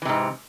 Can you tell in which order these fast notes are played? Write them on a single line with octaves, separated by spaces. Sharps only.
E3 C3 G#2